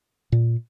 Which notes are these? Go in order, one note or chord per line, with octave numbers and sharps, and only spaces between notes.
A#2